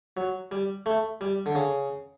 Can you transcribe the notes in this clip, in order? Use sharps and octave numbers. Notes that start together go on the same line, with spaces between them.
F#3
G3
A3
G3
D3
C#3